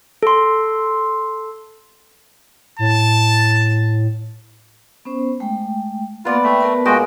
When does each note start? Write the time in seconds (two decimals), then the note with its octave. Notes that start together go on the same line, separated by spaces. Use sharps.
0.23 A4 C6
2.79 A2 A5
5.05 B3 C#4 C5
5.40 G#3 A3 G5
6.25 A#3 B3 F4 B4 D5 F#5
6.44 A3 G5
6.60 B3 A#4 A5
6.86 A#2 G#3 F#4 D#5 G5